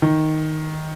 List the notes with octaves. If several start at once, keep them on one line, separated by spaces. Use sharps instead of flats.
D#3